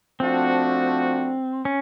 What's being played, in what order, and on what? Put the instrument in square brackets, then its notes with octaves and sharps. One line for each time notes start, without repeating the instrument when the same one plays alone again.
[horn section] F3 A3 D4 F#4 [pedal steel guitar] C4
[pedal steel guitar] C#4